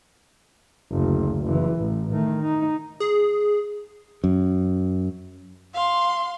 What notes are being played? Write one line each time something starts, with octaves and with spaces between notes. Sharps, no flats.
F#1 D2
F#1 E3
A1
D#3 A3
D#4
G#4
F#2
F5 C6